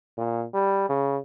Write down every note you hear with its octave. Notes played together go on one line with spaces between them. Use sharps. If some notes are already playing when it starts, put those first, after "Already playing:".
A#2
G3
C#3